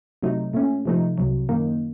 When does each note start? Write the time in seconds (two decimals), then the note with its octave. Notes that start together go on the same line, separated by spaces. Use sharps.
0.23 C3 F#3 A3 D#4
0.53 A#2 A3 C#4
0.85 C3 F3 A3 D#4
1.18 C2 C3 F#3
1.49 F#2 D#3 A#3 D#4